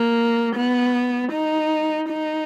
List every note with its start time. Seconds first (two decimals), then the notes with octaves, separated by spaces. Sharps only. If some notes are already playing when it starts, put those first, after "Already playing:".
Already playing: A#3
0.56 B3
1.32 D#4
2.09 D#4